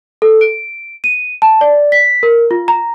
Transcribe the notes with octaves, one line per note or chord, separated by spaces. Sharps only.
A4
D7
D#7
A5
D5
B6
A#4
F4
A#5